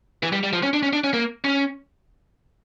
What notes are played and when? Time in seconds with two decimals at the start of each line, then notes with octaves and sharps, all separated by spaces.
0.23 E3
0.32 G3
0.43 G3
0.53 F3
0.63 C#4
0.73 D4
0.83 C#4
0.93 D4
1.04 C#4
1.14 A#3
1.44 C#4